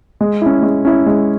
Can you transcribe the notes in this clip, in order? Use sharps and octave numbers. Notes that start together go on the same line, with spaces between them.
G#3
C#4 E4
G#3
C#4 E4
G#3